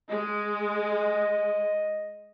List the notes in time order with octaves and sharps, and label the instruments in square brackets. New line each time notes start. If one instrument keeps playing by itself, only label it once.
[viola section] G#3 [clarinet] D#5